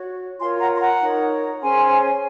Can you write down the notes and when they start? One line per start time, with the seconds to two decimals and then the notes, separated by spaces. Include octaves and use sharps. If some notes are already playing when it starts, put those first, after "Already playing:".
Already playing: F#4 C#5
0.39 F4 A#4 C#5 G#5 C6
0.60 F#5 A#5
0.76 C6
0.80 F#5 A#5
1.01 D#4 A#4 C#5
1.62 C#4 G#4 C5 G#5 C6